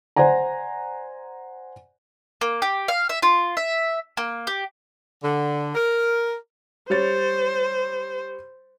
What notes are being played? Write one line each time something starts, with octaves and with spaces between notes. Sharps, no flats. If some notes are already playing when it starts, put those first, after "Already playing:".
C5 D5 F#5 G#5 A#5
A#3
G4
F5
E5
F4
E5
A#3
G4
D3
A#4
G3 C5 C#5 A6